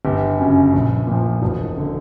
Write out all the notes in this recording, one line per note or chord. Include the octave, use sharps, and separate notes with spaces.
G1 G4
F#2 C#3
A#1
A#2 F3
E1
D3